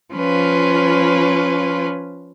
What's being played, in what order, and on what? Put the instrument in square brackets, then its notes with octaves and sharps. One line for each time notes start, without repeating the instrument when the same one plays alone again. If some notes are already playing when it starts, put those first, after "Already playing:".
[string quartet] F3 C#4 F4 B4